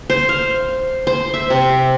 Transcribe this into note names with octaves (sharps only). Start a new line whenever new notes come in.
C5
F5
C5
E5
C3